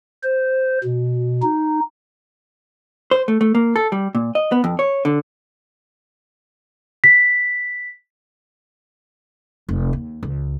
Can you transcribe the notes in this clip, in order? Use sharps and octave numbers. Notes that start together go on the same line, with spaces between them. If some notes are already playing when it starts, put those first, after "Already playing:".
C5
B2
D#4
C5
A3
A3
A#3
A4
G3
A#2
D#5
B3
F2
C#5
D3
B6
F1
D#2
C#2